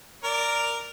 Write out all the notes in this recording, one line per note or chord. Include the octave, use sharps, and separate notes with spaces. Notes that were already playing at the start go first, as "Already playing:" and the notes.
A#4 D5